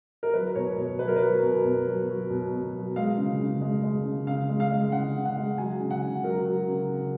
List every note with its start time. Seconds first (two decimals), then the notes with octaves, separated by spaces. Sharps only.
0.23 A#4
0.34 F#3 B4
0.55 B2 C#5
0.77 B2
0.99 F#3 B4
1.08 A#4
1.16 F#3 B4
1.43 B2
1.65 B2
1.87 F#3
2.09 F#3
2.30 B2
2.52 B2
2.74 F#3
2.96 G#3 F5
3.17 C#3
3.39 C#3
3.61 G#3
3.83 G#3
4.05 C#3
4.27 C#3 F5
4.49 G#3
4.60 F5
4.71 G#3
4.92 C#3 F#5
5.14 C#3
5.25 F#5
5.36 G#3
5.58 F#3 G#5
5.80 C#3
5.91 F#5
6.02 C#3
6.24 F#3 A#4
6.45 F#3
6.67 C#3
6.89 C#3